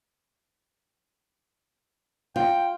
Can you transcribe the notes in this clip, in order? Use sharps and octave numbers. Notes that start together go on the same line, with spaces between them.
F4 G5